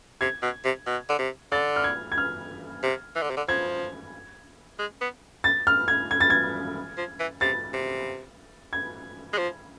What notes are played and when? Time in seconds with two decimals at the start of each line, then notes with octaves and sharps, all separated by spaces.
0.21 C3 G#6
0.42 B2
0.65 C3
0.87 B2
1.09 D3
1.19 C3
1.52 D3 A6
1.76 F6
1.84 G#6
2.12 G#6
2.18 F6
2.83 C3
3.15 E3
3.22 D3
3.30 C3
3.37 D3
3.48 F3 G#6
4.79 G#3
5.01 B3
5.44 A6
5.67 F6
5.88 G#6
6.11 G#6
6.20 A6
6.30 G#6
6.98 F3
7.20 E3
7.41 C3 A6
7.74 C3
8.73 G#6
9.33 G#3
9.38 F3